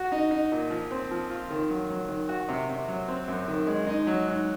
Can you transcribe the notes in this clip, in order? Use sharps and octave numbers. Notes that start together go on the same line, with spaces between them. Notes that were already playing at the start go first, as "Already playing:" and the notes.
Already playing: F#4
D#4
D#4
A#2
F3
C4
F3
F4
D#3
F#3
F#3
D#3
F#4
C3
C3
F#3
C4
F#2
D#3
G#3
D#4
F#3
G#2